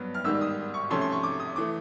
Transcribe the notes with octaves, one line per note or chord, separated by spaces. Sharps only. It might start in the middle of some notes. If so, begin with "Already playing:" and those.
Already playing: G2 F#3 B3
F6
G#2 D#3 G3 E6
D#6
C#6
C3 F3 A3 C#4 C6
C6
C#6
D6
D#6
E3 A3 D6